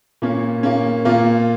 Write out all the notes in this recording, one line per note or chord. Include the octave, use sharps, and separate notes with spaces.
A#2 A#3 C#4
A#2 A#3 C#4
A#2 A#3 F4